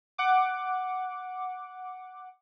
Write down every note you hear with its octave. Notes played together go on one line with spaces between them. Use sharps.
F#5 D6